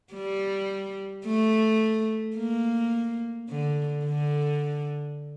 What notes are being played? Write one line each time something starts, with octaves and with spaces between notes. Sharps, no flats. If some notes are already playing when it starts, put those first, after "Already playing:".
G3
A3
A#3
D3
D3